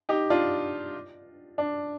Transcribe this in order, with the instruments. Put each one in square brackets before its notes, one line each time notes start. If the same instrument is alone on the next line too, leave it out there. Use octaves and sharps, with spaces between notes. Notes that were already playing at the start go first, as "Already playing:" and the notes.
[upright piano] D#4 G4
D4 F4
D4